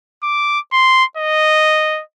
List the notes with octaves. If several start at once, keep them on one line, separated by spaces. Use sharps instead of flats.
D6
C6
D#5